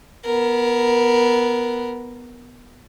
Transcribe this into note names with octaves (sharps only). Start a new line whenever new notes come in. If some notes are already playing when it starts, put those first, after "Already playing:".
B3 A#4